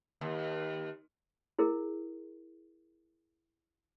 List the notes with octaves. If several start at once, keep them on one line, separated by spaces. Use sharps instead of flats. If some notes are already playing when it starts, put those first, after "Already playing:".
D#2
E4 G#4 A#4